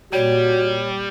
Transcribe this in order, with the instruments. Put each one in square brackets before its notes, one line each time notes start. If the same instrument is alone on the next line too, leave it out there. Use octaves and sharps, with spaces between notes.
[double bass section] A#2 [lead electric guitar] G3 [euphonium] F#4 [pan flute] C#5